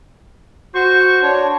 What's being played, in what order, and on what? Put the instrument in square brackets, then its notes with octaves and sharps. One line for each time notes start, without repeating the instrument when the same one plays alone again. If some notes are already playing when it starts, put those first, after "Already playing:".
[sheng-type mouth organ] F#4 C#6 [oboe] C5
[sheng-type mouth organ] D4 C#5